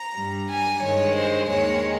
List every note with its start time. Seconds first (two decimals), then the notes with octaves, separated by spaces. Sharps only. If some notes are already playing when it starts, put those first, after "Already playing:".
Already playing: A#5
0.16 G2 G3
0.50 G#5
0.83 G2 D#3 G#3 C#5
1.16 C5
1.50 D#2 D#3 G#3 C#5